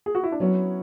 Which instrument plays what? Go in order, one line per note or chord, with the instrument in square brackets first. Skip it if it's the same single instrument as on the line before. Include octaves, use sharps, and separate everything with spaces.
[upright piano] G#4
F#4
E4
D4
[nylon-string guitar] F#3 B3 E4 [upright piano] C#4